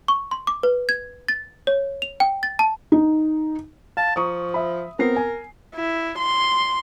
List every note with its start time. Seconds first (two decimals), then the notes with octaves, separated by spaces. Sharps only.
0.08 C#6
0.31 C6
0.47 D6
0.63 B4
0.89 G#6
1.28 A6
1.67 C#5
2.02 F7
2.20 G5
2.43 A6
2.59 A5
2.92 D#4
3.97 F5 A5
4.16 F3 A#5 C#6 D#6
4.54 E5 B5
4.99 B3 C4 A#4 C7
5.16 G#5
5.75 E4
6.19 C6